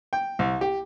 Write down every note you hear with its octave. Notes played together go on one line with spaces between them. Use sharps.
G5
C2
G4